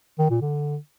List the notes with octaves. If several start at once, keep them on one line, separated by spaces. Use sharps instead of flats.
D#3
A#2
D3